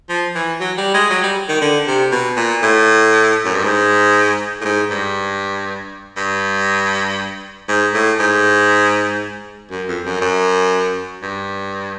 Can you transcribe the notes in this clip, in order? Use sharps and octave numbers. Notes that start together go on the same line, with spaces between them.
F3
E3
F#3
G3
G#3
F#3
G3
D#3
D3
C3
B2
A#2
A2
F#2
G2
G#2
A2
G#2
G2
G2
G#2
A2
G#2
F#2
F2
F#2
F#2
G2